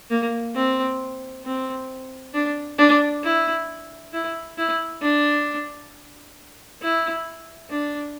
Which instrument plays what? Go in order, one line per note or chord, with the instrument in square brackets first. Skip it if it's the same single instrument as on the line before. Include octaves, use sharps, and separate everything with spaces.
[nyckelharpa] A#3
C4
C4
D4
D4
E4
E4
E4
D4
E4
D4